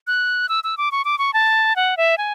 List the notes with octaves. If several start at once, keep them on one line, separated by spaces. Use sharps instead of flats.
F#6
E6
E6
D6
C#6
D6
C#6
A5
F#5
E5
G#5